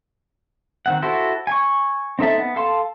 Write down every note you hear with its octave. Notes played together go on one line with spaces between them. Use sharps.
D#3 C4 F#5
E4 F#4 A4 C5
G#5 C#6
C4 D#4 A4 E5 A5
B3
A4 F5 A5 C6